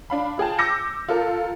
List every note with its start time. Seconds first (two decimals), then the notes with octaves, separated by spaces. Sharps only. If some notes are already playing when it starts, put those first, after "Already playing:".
0.10 D4 F5 B5
0.38 F4 G#4 G5 A5
0.58 D6 E6 G6 A#6 C#7
1.08 F4 A4 A#4